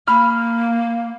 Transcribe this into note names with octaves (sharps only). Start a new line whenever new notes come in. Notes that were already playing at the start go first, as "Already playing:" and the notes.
A#3 B5 F6